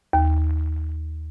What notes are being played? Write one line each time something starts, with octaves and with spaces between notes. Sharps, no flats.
D#2